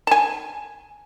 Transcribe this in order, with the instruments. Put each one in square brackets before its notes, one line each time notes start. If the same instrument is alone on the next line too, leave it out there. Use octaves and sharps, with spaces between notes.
[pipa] G#5 A5